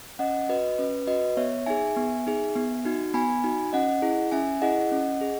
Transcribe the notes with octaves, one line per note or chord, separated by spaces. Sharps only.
C#4 D#5 F#5
F#4 B4 D#5
C#4 B4
F#4 B4 D#5
B3 C#5 E5
D#4 G#4 E5 G#5
B3
D#4 G#4
B3
D#4 F#4
B3 G#5 B5
D#4 F#4
C#4 D#5 F#5
E4 G#4
C#4 E5 G#5
E4 G#4 D#5 F#5
C#4
G#4